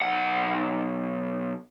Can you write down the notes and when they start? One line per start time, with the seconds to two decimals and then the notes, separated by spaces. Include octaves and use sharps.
0.02 B1 F#5